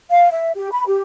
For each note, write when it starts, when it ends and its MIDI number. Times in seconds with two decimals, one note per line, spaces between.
0.11 0.28 77
0.31 0.50 76
0.56 0.68 67
0.72 0.84 83
0.87 1.02 67